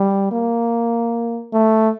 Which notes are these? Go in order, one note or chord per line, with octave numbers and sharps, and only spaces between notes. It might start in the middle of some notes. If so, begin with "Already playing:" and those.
Already playing: G3
A#3
A3